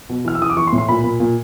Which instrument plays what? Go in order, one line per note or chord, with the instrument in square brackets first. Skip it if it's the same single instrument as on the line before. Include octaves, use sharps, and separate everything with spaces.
[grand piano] B2
E3 F6
E6
E3 D#6
D6
E3 C#6
C6
A2
C6
A#2 B5
A#2
A#2